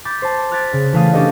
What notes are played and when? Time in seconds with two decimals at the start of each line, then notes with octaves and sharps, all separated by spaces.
0.05 B5 D6 G6 A6
0.22 C5 A5
0.51 F6 F#6 G#6 A6 B6 D7
0.73 C#3
0.93 E3 A3 A4 F5 D#6 D#7
1.13 C#4 D4 G4 A4 D5 D#5